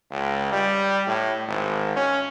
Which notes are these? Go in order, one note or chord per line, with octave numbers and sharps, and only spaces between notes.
C#2
G3
A2
G#1
C#4